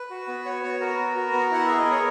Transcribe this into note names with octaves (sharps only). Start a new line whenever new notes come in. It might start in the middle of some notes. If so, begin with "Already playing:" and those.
Already playing: B4
F#4
B3
F#4 C#5
B3 C#5
F#4 A#4
B3
F#4
B3
E4 F#5
G#4 E5
D#5
B3
C#5